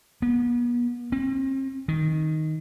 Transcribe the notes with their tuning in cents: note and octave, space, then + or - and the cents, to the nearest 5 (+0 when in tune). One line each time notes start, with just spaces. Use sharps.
B3 -40
C4 +40
D#3 +5